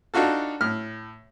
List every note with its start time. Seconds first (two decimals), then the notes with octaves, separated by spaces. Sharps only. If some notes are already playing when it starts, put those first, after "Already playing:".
0.14 D4 D#4 F4 F#4 A4
0.61 A2 F6